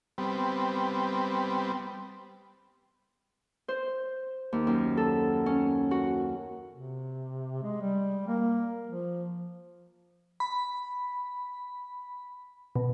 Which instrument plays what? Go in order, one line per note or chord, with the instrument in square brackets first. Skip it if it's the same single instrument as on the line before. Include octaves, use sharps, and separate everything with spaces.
[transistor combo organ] G3 B3 C4
[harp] C5
D#2
F#2
A4
C#4
F#4
[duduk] C3
G#3
G3
A#3
F3
[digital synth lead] B5
B2